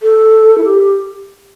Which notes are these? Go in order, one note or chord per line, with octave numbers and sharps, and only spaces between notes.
A4
E4
G4